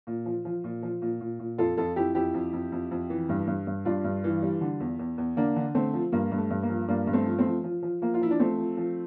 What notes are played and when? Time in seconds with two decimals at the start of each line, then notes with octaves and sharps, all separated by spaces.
0.07 A#2
0.26 F3
0.45 F3
0.64 A#2
0.83 F3
1.02 A#2
1.21 A#2
1.39 A#2
1.58 F2 F4 A4
1.77 F2 F4 A4
1.96 F2 E4 G4
2.15 F2 E4 G4
2.34 F2
2.53 F2
2.72 F2
2.91 F2
3.10 E3
3.29 G2
3.47 G2
3.67 G2
3.85 G2 D4 F4
4.04 G2
4.24 E3
4.42 G3
4.61 D3
4.80 E2
4.99 E2
5.18 E2
5.37 D3 A#3 D4
5.56 D3
5.75 D3 A3 C4
5.94 F3
6.12 G2 A#3
6.32 G2
6.38 A3
6.50 G2
6.63 A#3
6.69 F3
6.88 G2 A#3 D4
7.07 G2
7.13 A3 C4
7.26 F3
7.38 A3 C4
7.45 F3
7.64 F3
7.83 F3
8.02 F3 A#3
8.14 F4
8.21 F3 E4
8.31 D4
8.39 F3 A3 C4
8.58 F3
8.77 F3